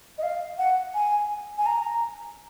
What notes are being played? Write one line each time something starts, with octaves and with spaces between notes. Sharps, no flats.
D#5
F5
F#5
G#5
G#5
A#5